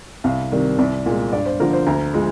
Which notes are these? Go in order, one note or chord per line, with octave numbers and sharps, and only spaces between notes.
C2 F5
C3 D#3 G3
C2 D5
A#2 G#3
G2 D5
C5
D3 F3 A#3 A#4
C5
D2 A#5
F3 G#3